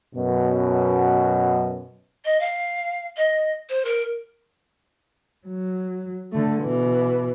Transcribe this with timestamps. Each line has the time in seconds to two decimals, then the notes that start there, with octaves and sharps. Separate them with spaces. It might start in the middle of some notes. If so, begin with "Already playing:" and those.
0.15 F#2 B2
2.25 D#5
2.39 F5
3.16 D#5
3.69 C5
3.85 A#4
5.46 F#3
6.32 D3 A3
6.62 B2 E3